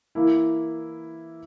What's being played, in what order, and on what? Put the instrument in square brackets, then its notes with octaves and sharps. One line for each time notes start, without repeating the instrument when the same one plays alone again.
[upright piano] E3 A#3 E4